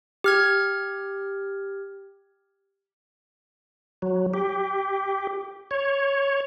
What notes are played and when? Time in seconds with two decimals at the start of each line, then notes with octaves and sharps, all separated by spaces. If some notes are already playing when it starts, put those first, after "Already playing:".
0.24 G4 F6 G#6
4.02 F#3
4.34 G4
5.71 C#5